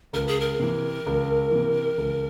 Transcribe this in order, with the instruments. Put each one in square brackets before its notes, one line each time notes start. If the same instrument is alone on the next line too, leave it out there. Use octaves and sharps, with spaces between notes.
[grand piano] C#2 [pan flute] A#4
[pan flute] G#4
A#4
[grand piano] C3 E3
C#2
C3 E3
C#2